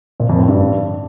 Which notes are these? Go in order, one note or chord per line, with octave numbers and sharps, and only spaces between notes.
A#2
F2
A2
G2